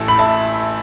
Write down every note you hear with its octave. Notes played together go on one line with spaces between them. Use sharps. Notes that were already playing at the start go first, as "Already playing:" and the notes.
Already playing: A1 A2 A3 E5 A5
B5
E5 A5